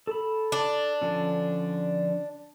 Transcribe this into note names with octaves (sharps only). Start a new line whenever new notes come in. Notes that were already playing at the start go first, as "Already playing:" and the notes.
A4 B5
D4
D3 F3 C#4